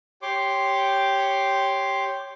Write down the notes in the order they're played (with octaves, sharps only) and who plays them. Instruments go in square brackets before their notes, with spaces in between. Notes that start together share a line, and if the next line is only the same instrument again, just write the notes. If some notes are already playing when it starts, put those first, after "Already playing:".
[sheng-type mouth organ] G4 C#5 C6 D6